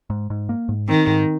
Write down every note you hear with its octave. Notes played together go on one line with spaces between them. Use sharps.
G#2
G#2
A#3
G#2
D#3 C4
G#2